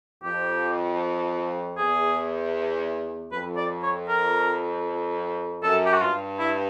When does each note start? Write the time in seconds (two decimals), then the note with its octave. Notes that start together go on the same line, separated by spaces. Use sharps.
0.23 F2 G4
1.77 E2 G#4
3.32 F2 B4
3.56 D5
3.83 C#5
4.08 A#4
5.63 F#2 A4
5.86 G4
5.94 F#4
6.01 G2 F4
6.39 E4